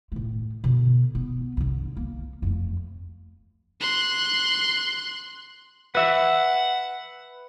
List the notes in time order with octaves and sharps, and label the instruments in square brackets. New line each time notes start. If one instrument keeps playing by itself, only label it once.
[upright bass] A2 A3
B2 D3
B3
C2 D3
A#3
F2 A3
[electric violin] C6 F#6
[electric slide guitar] B4 E5 [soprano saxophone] F#5